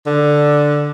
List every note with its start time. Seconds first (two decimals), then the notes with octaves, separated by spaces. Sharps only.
0.06 D3